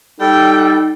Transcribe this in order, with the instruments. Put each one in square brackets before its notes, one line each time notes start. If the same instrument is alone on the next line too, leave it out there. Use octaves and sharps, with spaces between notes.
[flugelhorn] G3 [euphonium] D#4 [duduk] A4 [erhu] G5